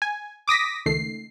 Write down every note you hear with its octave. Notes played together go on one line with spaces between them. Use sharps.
G#5
D6 D#6 A#6 B6
C#2 D#3 A3 C7